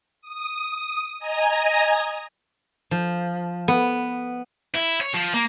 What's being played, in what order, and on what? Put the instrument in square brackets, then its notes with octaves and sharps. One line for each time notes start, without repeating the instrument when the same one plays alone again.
[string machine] D#6
D#5 G#5 A#5 D#6
[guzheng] F3
B3
[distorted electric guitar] E4
C#5
F3
A#3